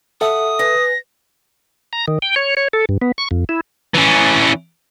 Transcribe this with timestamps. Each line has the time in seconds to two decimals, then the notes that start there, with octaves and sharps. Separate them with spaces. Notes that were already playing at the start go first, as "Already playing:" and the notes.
0.21 A4 E5 F#5 D#6
0.59 B4 G#5 A#6
1.93 A#5
2.08 D#3
2.22 G5
2.36 C#5
2.57 C#5
2.73 A4
2.89 G2
3.01 B3
3.18 C#6
3.31 F2
3.49 E4
3.94 E3 C#4